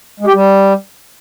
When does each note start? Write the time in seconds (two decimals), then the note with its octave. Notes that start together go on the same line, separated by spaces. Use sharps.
0.20 G#3
0.27 G4
0.33 G3